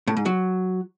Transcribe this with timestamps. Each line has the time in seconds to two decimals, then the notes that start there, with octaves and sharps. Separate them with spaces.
0.07 A2
0.17 G#2
0.26 F#3